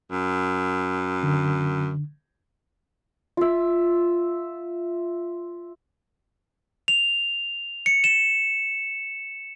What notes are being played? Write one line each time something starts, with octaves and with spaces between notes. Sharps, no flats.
F#2
D3
F4 E5
F7
C#7
E7